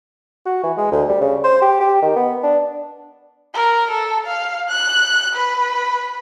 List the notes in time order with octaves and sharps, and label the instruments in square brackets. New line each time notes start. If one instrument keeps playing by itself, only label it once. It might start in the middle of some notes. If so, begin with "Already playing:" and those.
[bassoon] F#4
E3
G#3
D2
G3
C#3
C5
G4
G4
D#3
B3
D4
[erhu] A#4
A4
F5
F#6
B4